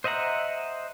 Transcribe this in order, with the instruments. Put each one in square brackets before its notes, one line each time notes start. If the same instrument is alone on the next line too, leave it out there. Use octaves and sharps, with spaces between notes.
[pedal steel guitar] C5 D#5 E5 F#5 A#5